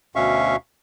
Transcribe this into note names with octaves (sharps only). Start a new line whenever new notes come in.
D2 B2 C#4 E5 F5 C#6